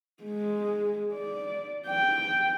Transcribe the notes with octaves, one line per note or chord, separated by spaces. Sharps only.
G#3
D5
G5